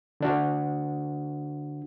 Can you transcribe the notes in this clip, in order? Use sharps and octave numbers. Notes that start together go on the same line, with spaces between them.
D3 D4 F#4